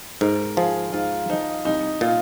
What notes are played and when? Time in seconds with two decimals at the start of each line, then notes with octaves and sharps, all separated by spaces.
0.21 G#2 A#4
0.57 F3 G#4
0.93 G#2 F4
1.30 F3 D#4
1.65 C2 D#4
2.01 A#2 F4